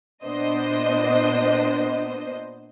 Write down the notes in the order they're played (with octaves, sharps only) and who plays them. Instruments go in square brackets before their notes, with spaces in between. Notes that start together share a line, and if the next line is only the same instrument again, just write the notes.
[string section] A#2 B3 D4 C5 D#5